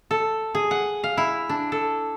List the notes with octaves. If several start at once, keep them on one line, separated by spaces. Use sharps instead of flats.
A4
G#4
F#5
F5
E4
D4
A4